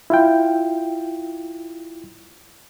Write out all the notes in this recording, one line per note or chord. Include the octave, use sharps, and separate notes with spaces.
E4 F4 G5